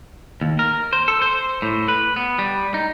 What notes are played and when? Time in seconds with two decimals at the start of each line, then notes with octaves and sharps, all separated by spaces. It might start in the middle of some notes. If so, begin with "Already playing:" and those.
0.41 D#2
0.59 A#4
0.93 C5
1.08 A4
1.22 C5
1.62 A2
1.88 B4
2.16 B3
2.39 G3
2.74 D#4